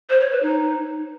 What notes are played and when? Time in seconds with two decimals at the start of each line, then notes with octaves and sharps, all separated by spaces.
0.10 C5
0.21 C#5
0.32 B4
0.42 D#4